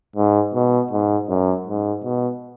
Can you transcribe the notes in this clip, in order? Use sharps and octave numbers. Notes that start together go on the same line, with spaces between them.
G#2
B2
G#2
F#2
G#2
B2